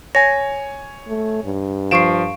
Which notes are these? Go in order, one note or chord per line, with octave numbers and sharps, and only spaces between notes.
C#5 G#5 A#6
A3
G2
F3 F5 C#6 C7 D7 E7